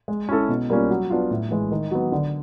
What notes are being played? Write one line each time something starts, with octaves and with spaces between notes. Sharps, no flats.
G#3
C#4 E4 A4
B2
G3 A#3 C#4 F4
F#3
B3 D4 F4
A2
E3 G#3
D#3
F#3 B3
D3